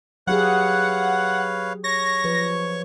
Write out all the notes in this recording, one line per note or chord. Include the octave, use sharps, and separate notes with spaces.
F#3 G4 G#4 B4 C#5 F5 F#5
C#5 C#6 A#6
F3 B4